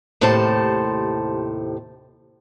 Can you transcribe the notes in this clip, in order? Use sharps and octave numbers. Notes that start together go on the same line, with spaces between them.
D#2 A2 C3 C5 A5